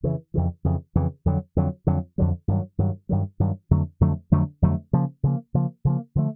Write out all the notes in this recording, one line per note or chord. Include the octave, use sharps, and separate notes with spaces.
F2 C#3 E3
F2 C#3 E3
F2 C#3 E3
F2 C#3 E3
F2 D3 F#3
F2 D3 F#3
F2 D3 F#3
F2 D3 F#3
G2 D#3 F#3
G2 D#3 F#3
G2 D#3 F#3
G2 D#3 F#3
F2 D3 F#3 A3
F2 D3 F#3 A3
F2 D3 F#3 A3
F2 D3 F#3 A3
C#3 F3 A#3
C#3 F3 A#3
C#3 F3 A#3
C#3 F3 A#3
D3 F3 A3